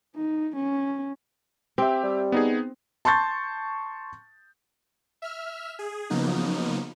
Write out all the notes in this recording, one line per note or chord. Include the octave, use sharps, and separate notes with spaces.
D#4
C#4
C4 G4 E5
G3
B3 D#4 G#4
A5 C6 C#6 G6 A6
E5 F6
G#4
C#3 F3 F#3 A#3 B3 D#4